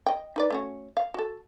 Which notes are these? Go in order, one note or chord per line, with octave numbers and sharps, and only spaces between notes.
D#5 G5
D#4 B4 D5
A3 C#4 F#4
F5
F#4 A4